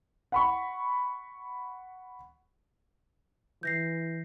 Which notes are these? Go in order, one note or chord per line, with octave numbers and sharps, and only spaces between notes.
F#5 B5 C#6
E3 G6 A#6 C7